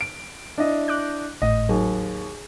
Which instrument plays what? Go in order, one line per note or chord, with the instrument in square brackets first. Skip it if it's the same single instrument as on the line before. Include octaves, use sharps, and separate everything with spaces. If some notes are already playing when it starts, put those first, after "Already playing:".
[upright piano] D7
D4 E4 D#5
[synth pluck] D6 F#6 G6
[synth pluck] G#1 A2 [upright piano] D#5
[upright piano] D#2 [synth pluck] F#3 G#4